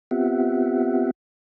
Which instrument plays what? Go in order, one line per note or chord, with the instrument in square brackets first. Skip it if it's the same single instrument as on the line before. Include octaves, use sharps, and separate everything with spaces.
[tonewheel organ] B3 C4 F4 G4 E5 F#5